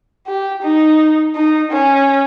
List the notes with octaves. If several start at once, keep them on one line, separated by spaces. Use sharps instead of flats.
G4
D#4
D#4
C#4